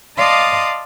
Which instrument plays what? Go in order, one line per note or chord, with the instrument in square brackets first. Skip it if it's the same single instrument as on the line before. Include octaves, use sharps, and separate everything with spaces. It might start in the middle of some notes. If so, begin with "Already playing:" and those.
[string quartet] D5 D#5 F5 A5 C6 D#6